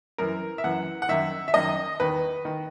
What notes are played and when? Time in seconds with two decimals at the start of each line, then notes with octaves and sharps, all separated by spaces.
0.18 F#2 E3 A#4
0.58 E5
0.64 F#2 E3 F#5
1.02 F#5
1.09 F#2 D#3 E5
1.48 E5
1.54 F#2 D#3 D#5
2.00 E2 D#3 B4
2.45 D#3